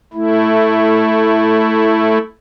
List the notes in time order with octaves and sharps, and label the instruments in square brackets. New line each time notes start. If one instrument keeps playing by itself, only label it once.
[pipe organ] A3 E4